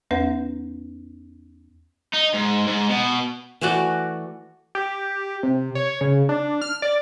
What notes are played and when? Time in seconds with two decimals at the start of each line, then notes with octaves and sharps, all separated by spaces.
0.11 E2 B3 C#4 B4 F#5 A#6
2.14 D#4
2.34 G#2
2.67 G#2
2.90 B2
3.61 E3 A3 F#4 D5
4.75 G4
5.43 C3
5.75 C#5
6.01 C#3
6.29 D4
6.62 F6
6.82 D5